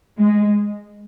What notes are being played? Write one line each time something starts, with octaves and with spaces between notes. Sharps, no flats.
G#3